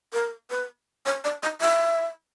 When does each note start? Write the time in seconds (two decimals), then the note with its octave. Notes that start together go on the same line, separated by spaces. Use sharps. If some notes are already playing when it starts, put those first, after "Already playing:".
0.13 A#4
0.50 B4
1.06 C#5
1.24 D5
1.43 D#5
1.61 E5